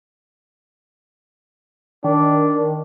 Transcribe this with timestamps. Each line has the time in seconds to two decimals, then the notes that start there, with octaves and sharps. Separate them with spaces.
2.04 D#3 D4